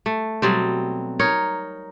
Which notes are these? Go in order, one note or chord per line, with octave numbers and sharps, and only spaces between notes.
A3
B2 F#3 G3 C4
D#4 A#4 C#5